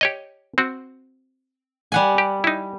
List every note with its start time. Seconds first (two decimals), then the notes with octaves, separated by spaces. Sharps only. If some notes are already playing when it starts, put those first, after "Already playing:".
0.01 G4 C#5 D#5
0.58 C4 F#4
1.92 G3 F#5 G#5
2.18 G4
2.44 D#4 E4